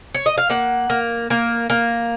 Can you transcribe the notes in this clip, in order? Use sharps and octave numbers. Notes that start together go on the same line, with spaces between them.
C#5
D#5
F5
A#3 F#5
A#3
A#3
A#3